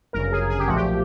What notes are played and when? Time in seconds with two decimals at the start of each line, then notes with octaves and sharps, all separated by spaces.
0.13 G1 F#2 C#3 A#4
0.32 G#4
0.50 G#4
0.59 G4
0.68 B1 A#2 F3 A3 F#4
0.76 G4